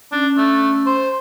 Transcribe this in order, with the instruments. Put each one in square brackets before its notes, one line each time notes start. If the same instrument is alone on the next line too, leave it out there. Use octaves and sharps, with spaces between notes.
[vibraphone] C#4 [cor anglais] D4
[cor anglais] A3
C5